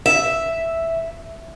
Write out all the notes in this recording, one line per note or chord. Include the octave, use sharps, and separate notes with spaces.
E5